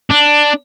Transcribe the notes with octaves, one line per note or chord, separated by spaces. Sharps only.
D4